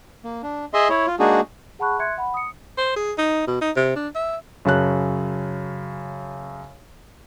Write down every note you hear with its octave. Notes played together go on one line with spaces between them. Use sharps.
A#3
D4
G#4 D#5 E5 C6
E4 C#5
F4
G#3 A#3 D4 D#4 F#4 G#4
G#4 F#5 A5 B5 C#6 F#6
E5 C6 F#6 G#6 C#7
F#5 B5
D#6 C#7
C5
G#4
D#4
B2
D#4
C3
D4
E5
F#2 C#3 A5 F#6